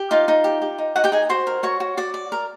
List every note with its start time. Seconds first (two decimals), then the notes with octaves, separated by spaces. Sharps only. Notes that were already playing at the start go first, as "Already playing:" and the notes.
Already playing: G4
0.11 D#4 F4 F5
0.28 D#4
0.44 G4
0.62 G4
0.78 D#4
0.96 D#4 F#4 F#5
1.04 G4 G5
1.12 D#4 G#4 G#5
1.29 F#4 C5 C6
1.47 A#4
1.63 F#4 C#5 C#6
1.80 F#4
1.97 F#4 D5 D6
2.14 D5
2.32 A#4